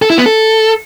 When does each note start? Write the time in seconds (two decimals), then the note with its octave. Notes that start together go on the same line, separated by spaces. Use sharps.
0.02 A4
0.10 E4
0.18 B3
0.26 A4